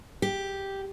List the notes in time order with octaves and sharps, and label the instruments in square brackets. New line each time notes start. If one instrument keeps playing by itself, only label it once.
[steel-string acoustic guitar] G4